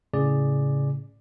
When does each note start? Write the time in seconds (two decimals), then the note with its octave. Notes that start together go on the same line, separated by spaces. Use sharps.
0.13 A2 C#3 G#4 D5